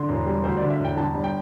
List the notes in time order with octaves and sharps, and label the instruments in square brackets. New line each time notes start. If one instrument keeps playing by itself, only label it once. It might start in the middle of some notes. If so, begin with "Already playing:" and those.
Already playing: [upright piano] D3 C6
E1
G3
D2 C5
D3 D5
E5
E1
G5
G1 A5
G2
G5